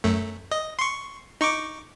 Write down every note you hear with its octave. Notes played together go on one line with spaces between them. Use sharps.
F#2 A3
D#5
C6 C#6
D#4 C#6 D6